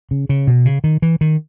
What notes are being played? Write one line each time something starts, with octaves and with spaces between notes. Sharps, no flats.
C#3
C#3
B2
C#3
D#3
E3
D#3